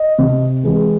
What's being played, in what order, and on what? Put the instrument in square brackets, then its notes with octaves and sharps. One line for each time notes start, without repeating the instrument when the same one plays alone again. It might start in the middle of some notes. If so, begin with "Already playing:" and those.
Already playing: [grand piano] D#5
C3
E3 G#3